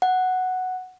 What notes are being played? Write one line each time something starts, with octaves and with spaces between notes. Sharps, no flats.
F#5